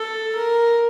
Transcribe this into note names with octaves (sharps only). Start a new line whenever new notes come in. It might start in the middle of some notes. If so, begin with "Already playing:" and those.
Already playing: A4
A#4